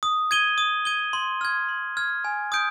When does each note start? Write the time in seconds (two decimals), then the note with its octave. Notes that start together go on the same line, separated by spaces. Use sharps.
0.03 D#6
0.31 G#6 D#7 G7
0.58 D#6
0.85 G#6 D#7 G7
1.13 C6
1.41 F6 G#6
1.69 C6
1.97 F6 G#6
2.25 G#5
2.52 D#6 G6 D7